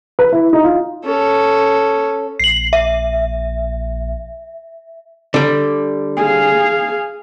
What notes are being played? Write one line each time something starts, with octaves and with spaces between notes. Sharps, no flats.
B4
E4
D#4
F4
C#4 A4
A#1 C7 F#7
E5
D3 G3
G#4 F5